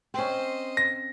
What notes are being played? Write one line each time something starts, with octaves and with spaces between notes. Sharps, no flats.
C4 C#4 C5 D#5
A#6